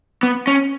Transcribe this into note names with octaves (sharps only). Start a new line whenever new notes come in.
B3
C#4